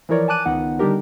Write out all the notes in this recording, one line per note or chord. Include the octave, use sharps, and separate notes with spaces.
E3 F3 E4 A#4 C#5 D5
G#5 A5 D6 F#6 D#7
C#2 D#3 B3 D#4 F#5
D3 G3 D4 D#4 G4 A#4